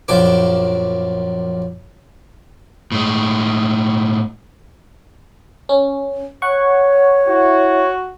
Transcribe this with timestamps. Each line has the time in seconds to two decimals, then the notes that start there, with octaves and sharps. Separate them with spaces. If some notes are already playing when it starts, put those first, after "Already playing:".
0.08 A#1 F#2 F3 D4 D6
2.92 A2 G#3
5.69 C#4
6.42 C#5 F#5 C#6
7.28 E4 F#4